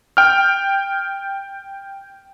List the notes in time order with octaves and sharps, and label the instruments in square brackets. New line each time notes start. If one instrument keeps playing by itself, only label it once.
[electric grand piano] G5 F6